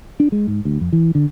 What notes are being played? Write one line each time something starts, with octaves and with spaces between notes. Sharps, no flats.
D4
G#3
G#2
D2
F2
E3
D3